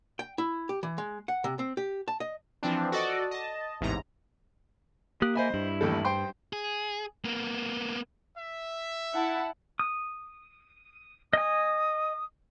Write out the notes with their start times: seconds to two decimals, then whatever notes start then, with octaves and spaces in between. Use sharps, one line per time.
0.19 G5
0.38 E4
0.69 G4
0.83 E3
0.98 G#3
1.28 F#5
1.44 C3
1.59 C4
1.77 G4
2.08 A5
2.20 D#5
2.63 E3 F3 C4 D4
2.92 F#4 A4 D5 D#5
3.31 D#5 A5
3.81 A1 E2 G#2 C3 A#5
5.22 A#3 G4 D#6 F#6
5.36 C5 D#5 E5 G#5 B5
5.54 G2 E4
5.81 A1 D#2 A4
6.05 C5 G5 C6
6.53 G#4
7.25 A#3 B3
8.36 E5
9.15 E4 F#5 A5
9.79 D#6
11.33 D#5 G#5 D#6